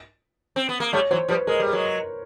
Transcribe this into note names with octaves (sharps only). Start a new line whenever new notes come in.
C4
B3
A#3
G3 A3 C#5
E3 F#3 C5
F3 G3 B4
G#3 A#4
G3
F#3 G#3